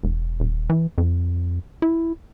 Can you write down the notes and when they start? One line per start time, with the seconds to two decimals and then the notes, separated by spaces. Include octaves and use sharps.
0.03 E1
0.40 D#1
0.70 E3
0.98 F2
1.82 E4